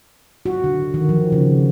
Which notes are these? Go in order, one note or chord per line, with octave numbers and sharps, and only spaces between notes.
F#4
D3
D#3
F3
C#3